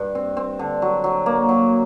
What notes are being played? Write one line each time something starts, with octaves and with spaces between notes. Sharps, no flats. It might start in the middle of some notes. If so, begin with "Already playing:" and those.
Already playing: G2
C4
C4
D3
F#3
F#3
A#3
F#3